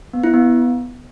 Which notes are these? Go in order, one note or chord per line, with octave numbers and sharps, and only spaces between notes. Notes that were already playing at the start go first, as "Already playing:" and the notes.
B3
E4
B3